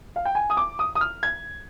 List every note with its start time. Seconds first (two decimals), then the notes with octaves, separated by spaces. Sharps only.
0.16 F5
0.25 G5
0.35 G#5
0.50 D#6
0.57 D6
0.79 D#6
0.95 D#6
1.01 F6
1.23 G#6